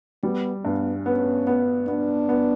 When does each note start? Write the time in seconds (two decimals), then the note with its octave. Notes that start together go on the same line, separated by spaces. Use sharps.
0.23 G3 B3
0.64 G2 B3
1.06 B3 C#4
1.47 B3
1.88 B3 D4
2.29 B3